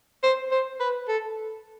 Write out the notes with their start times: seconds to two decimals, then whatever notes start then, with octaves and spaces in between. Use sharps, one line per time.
0.23 C5
0.51 C5
0.80 B4
1.08 A4